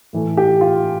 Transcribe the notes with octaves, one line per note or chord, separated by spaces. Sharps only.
A2 E3 A3
G4
F4